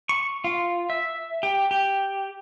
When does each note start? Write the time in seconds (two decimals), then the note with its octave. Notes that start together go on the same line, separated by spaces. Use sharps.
0.09 C#6
0.44 F4
0.90 E5
1.43 G4
1.71 G4